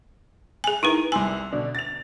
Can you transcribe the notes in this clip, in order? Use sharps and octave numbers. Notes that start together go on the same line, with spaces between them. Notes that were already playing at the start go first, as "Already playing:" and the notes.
G#4 G#5
D#4 E4 A#4 B4
C2 G#5 C6 E6
B2 D3 D4
A6 F7